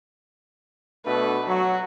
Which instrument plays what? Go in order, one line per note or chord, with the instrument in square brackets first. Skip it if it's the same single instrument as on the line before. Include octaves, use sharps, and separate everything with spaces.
[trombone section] B2 A3 D4 [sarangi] B4
[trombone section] F#3 [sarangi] F#4